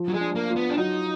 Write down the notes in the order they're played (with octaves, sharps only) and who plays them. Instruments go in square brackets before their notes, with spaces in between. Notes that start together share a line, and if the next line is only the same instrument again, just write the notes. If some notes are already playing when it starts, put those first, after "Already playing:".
Already playing: [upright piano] F3
[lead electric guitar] F#3
G#3
[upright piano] D4
[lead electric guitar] A#3
[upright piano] F4
[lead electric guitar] B3
D4
[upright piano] F#3 [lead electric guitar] D#4